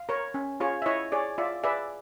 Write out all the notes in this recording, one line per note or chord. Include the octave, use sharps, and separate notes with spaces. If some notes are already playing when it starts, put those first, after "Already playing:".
Already playing: F5
A#4 C#5
C#4
F4 G#4 C#5
E5
E4 C#5 D#5
G#4 C#5 D5
F4 D5 E5
G#4 B4 D5 E5